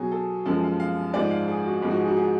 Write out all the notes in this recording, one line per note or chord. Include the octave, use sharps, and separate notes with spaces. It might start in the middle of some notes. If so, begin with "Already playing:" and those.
Already playing: B2 F#3 G#4
A4
F#2 F3 G#3 A4
F5
F5
G#2 F3 G#3 D5
F5
G#4
F#4
G#2 F3 G#3
F#4
G#4
F#4
G#4